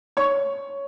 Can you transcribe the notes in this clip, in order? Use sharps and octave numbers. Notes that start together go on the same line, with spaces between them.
C#5 C#6